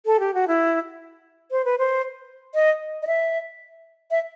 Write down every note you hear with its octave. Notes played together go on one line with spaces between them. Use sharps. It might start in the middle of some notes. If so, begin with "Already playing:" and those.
A4
G4
F#4
E4
C5
B4
C5
D#5
D#5
E5
E5